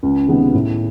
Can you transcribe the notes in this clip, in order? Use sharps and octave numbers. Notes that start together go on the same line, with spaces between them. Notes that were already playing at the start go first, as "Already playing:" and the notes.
C#2
C3 D#3 G#3 B3
A2